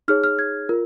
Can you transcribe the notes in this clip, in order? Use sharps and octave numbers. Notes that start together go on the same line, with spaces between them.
D#4 G#4 C#5 F6
F6
G#6
F4 A#4